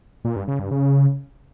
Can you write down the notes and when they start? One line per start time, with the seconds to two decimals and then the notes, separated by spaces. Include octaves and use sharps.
0.25 A#2
0.36 G2
0.48 C#3
0.60 G2
0.71 C#3